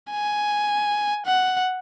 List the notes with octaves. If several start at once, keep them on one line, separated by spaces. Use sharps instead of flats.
G#5
F#5